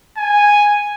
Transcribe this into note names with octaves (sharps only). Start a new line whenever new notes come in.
G#5